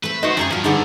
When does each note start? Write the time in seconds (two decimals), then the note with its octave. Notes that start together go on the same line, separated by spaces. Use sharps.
0.03 A3 C4 B4
0.23 F#2 D#4 F#4 B4 C5 D#5
0.37 F#2 C3 G3 G#4 A4 C5 A#5
0.51 G2 A#2 F3 F#3
0.64 G#2 D3 D#4 G#4 B4